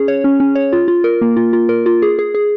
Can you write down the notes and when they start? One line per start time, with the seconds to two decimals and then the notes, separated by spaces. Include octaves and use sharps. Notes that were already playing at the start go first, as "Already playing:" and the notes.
Already playing: C#4 G#4
0.08 C#5
0.24 C#4
0.40 C#4
0.55 C#5
0.73 F4
0.88 F4
1.04 A#4
1.21 A#3
1.36 F4
1.53 F4
1.69 A#4
1.86 F4
2.02 G#4
2.19 G#4
2.35 G#4